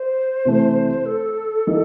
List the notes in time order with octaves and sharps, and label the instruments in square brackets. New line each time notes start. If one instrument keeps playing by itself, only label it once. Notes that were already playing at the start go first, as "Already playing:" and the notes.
Already playing: [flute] C5
[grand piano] C3 E3 A3
[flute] A4
[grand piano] E3 G3 A#3 D#4